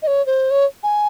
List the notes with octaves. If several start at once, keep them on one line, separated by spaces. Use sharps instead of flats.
D#5
C#5
C5
C#5
G#5